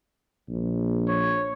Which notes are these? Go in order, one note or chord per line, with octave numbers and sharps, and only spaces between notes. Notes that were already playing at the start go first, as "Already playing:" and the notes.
A#1
C#5